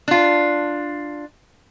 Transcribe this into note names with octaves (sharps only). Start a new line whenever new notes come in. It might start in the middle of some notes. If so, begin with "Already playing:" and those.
D4 F4